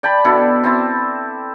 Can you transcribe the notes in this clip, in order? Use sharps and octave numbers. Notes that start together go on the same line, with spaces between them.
D5 G5 A5 B5
B2 D3 E4 A4
C4 E4 A5